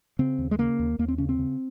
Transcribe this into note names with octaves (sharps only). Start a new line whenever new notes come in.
C#3 C4
D#2
G#3
C#3 A#3
D#2
D#2 A#3
C4
C#3 C#4
C4
C#3